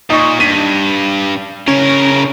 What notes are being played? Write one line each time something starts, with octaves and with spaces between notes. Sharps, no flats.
A#2 D#4 C#6
G2 B6 D#7
C#3 C#4 A#4